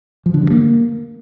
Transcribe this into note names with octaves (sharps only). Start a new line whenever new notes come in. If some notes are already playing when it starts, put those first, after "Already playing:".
F3
D3
G2
A#3